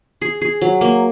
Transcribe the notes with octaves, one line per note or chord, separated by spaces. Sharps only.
G#4
G#4
F#3
A#3